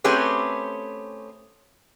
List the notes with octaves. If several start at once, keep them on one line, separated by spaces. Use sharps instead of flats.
A3 C4 C#4 G4 G#4 B4